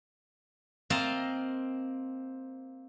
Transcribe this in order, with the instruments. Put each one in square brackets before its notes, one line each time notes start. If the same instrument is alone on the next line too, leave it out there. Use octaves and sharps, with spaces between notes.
[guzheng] A#3 C4 D#5 F5 A5